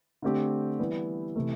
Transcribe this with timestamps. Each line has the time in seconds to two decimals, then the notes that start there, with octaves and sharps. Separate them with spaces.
0.22 D3 A3 C4 G4
0.79 E3 G3 B3
1.36 C3 E3 A3